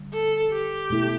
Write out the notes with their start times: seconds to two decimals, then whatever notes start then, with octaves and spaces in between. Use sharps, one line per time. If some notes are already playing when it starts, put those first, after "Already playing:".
Already playing: D3 G3
0.13 A4
0.52 G4
0.90 B2 A3 E4 A4